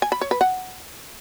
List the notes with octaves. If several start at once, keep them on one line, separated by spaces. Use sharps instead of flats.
G#5
B5
C#5
B4
F#5